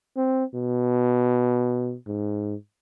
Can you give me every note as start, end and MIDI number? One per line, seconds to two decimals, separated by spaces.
0.17 0.44 60
0.54 1.95 47
2.07 2.55 44